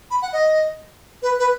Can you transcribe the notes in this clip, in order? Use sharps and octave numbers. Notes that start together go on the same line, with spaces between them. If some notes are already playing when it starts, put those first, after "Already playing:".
B5
F#5
D#5
B4
B4